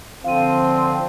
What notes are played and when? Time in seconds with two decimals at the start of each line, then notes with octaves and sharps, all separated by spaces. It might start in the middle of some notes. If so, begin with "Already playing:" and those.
0.24 D3 F3 C4 F4 F5 D#7